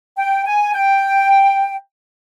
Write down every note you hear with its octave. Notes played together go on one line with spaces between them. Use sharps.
G5
G#5
G5